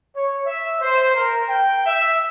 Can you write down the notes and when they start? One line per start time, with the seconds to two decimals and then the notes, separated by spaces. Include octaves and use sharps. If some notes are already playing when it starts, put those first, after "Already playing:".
0.16 C#5
0.46 E5
0.81 C5
1.16 A#4
1.49 G5
1.85 E5